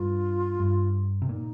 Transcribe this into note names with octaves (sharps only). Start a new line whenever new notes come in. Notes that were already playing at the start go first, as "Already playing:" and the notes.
Already playing: G2 F4
G2
C3
A#2 D#4